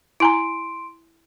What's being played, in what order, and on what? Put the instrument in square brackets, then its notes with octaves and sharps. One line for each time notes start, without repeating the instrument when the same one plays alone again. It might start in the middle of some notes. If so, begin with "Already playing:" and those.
[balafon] E4 G#5 A#5 [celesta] C6 D7